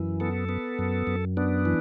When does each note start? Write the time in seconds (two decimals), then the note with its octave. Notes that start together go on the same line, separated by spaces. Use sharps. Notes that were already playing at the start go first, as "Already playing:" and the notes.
Already playing: F#2 E3
0.20 B3 A4
0.49 B3
0.79 F#2
1.07 F#2
1.37 B3 D4
1.65 E3